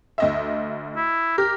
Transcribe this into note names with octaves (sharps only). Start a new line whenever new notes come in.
D2 D#5 E5
E4
G4 A#4